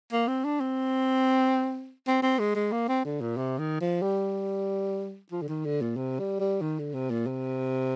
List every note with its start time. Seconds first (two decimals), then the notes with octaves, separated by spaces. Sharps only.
0.12 A#3
0.28 C4
0.45 D4
0.60 C4
2.07 C4
2.22 C4
2.39 G#3
2.55 G#3
2.72 A#3
2.89 C4
3.05 D3
3.21 A#2
3.37 C3
3.58 D#3
3.81 F3
4.02 G3
5.31 F3
5.42 D3
5.48 D#3
5.65 D3
5.81 A#2
5.96 C3
6.19 G3
6.40 G3
6.61 D#3
6.79 D3
6.94 C3
7.10 A#2
7.26 C3